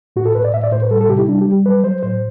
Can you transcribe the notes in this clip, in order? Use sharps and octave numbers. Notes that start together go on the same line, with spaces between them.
A2 F#4
A4
A2 B4
D5
A2 E5
D5
A2 C5
B4
G3 A4
A4
C3 G4
E4
G3 D4
G4
G3
F#3 B4
F#3 C5
A2 C5